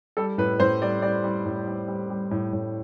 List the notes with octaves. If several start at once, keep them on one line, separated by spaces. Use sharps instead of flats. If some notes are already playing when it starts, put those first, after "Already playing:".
G3 A4
A2 B4
A2 C5
G3 D5
G3 D5
G3
A2
G3
G3
G3
A2
A2